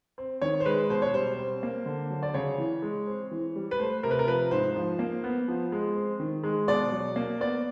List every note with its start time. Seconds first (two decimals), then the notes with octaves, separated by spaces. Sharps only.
0.18 C4
0.41 D#3 C#5
0.60 C5
0.66 G#3 B4
0.90 B2 C5
1.02 C#5
1.14 G3 C5
1.38 C4
1.63 A#3
1.86 D3
2.10 F#3
2.23 D5
2.34 C#3 C#5
2.58 E3
2.82 G#3
3.07 C4
3.31 E3
3.56 G3
3.71 B4
3.79 A3 C5
4.03 C3 A#4
4.11 B4
4.19 A#4
4.27 F3 B4
4.51 G#2 C5
4.76 F3
4.99 A#3
5.24 B3
5.48 F3
5.72 G#3
5.95 C4
6.20 D#3
6.44 G#3
6.68 B2 D5
6.92 F#3
7.16 A#3
7.41 B3 D5